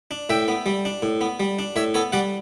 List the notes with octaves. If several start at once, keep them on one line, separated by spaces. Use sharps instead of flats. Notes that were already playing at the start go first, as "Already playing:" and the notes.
D4
A2 E5 G5
B3
G3
D4
A2
B3
G3
D4
A2 C#5 E5
B3 A4 C#5
G3 D5 F#5